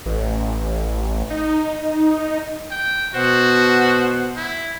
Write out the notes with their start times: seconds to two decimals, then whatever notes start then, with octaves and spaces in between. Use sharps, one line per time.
0.06 A1
1.30 D#4
2.71 G5
3.14 B2 F#4 C5 F#5
4.36 E4